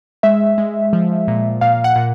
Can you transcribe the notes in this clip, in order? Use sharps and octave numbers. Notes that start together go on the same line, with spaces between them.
G#3 E5
G#3
F3
A#2
A#2 F5
F#5
A#2